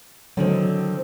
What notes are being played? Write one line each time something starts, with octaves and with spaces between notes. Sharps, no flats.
D3 D#3 F#3 C4